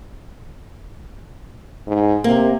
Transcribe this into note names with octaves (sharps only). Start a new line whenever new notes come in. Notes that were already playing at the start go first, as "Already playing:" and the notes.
G#2
C3 A#3